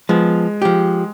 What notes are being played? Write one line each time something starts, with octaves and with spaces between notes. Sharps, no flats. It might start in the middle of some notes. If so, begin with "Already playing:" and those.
F3 G#3 B3
F3 G4